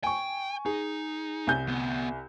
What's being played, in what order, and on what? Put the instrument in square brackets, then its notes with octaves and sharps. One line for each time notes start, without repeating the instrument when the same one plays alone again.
[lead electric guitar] G5 [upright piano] G#5 C#6
[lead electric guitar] D#4 [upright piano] G#4
[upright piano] C2 G#5 G6
[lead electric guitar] D2 B3